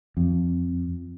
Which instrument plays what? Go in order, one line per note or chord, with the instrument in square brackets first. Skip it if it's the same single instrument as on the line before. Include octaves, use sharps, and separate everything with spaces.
[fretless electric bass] F2